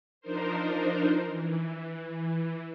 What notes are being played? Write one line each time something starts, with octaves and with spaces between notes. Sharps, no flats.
F3 D4 D#4 A#4 C5
E3